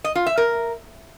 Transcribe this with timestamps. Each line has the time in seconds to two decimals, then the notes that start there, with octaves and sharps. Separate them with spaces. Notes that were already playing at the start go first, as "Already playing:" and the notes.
0.04 D#5
0.15 F4
0.26 E5
0.38 A#4